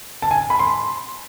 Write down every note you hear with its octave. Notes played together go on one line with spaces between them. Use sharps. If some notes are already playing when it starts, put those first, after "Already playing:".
A5
G#5
B5
C6